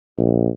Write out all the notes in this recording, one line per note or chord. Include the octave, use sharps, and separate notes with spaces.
A#1